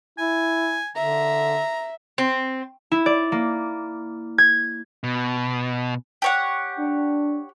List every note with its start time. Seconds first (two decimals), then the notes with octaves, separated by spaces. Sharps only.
0.18 E4 G#5
0.96 D3 E5 A#5
2.18 C4
2.91 E4
3.06 D5
3.32 A#3
4.38 G#6
5.04 B2
6.22 G4 C#5 F#5
6.78 D4